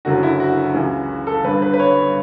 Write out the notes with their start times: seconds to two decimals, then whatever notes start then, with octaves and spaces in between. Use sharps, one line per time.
0.05 F#1 F#2 D3 F#4
0.23 E4
0.40 F#4
0.74 C#2 C#3 E3
1.27 A4
1.44 G1 G2 D3 B4
1.62 B4
1.74 B4
1.80 C#5